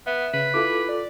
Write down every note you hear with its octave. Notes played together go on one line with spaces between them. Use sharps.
B3 E5
C#3 B4
E4 F4 A4 D6
D5